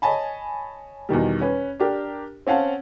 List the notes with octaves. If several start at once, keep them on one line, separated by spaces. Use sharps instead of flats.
C#5 D#5 G#5 A5 B5
E2 B2 D#3 G3
C#4 B4
D4 G4 A#4
C4 C#4 F5 F#5 A5